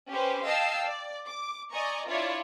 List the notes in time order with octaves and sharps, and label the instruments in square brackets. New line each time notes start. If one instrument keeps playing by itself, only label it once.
[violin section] C#4 G4 B4 C5
D#5 F5 G5 A5 E6 C7
D5
D6
D5 D#5 G#5 A#5 C#6
D4 E4 F4 C#5 D5